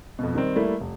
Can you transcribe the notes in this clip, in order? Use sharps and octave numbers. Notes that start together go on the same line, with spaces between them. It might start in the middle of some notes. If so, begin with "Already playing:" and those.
F2 B2
D#3 G3 C4
G3 A3 A#3 E4
F1